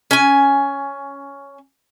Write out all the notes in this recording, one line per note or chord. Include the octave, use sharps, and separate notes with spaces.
C#4 G#5